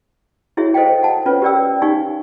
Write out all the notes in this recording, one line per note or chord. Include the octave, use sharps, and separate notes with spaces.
E4 F#4 G#4 C#5 E5
A4 C5 D#5 F5 G5
F#5 A5
C#4 F4 B4 C#5
G4 A#4 D5 G5 E6
D#4 G4 F5 G#5 C#6